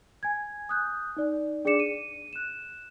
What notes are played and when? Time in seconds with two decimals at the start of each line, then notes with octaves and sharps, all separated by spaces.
0.23 G#5 G#6
0.69 D#6 F#6 G6
1.17 D#4 D5
1.65 D4 G#4 D5 D6 C#7 E7
1.79 D#7
2.33 F#6 E7